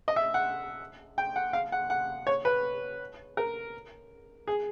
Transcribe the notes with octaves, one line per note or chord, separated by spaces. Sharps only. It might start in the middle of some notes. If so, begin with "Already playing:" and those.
D#5
E5
F#5
G5
F#5
F5
F#5
F#5
C#5
B4
A#4
G#4